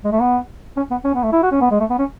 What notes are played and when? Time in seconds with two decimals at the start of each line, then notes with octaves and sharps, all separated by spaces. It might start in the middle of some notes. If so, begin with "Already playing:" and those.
0.04 G#3
0.12 A3
0.20 B3
0.77 C#4
0.91 B3
1.04 C#4
1.15 B3
1.23 A3
1.32 E4
1.43 F#4
1.51 C#4
1.61 B3
1.71 G#3
1.80 A3
1.90 B3
1.99 C#4